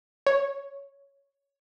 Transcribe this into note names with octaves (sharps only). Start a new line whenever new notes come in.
C#5